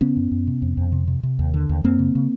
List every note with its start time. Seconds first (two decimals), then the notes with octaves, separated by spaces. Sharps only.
0.01 C#3 B3 C#4
0.17 F#2
0.32 F#2
0.47 C3
0.62 F2
0.77 F2
0.92 C3
1.08 C3
1.23 C3
1.39 D#2
1.54 D3
1.69 D#2
1.84 F#2 A#3 C4
1.99 C#3
2.15 C#3